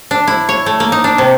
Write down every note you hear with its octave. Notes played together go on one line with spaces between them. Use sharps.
D4
E4
C#5
A3
A#3
D#4
D4
C3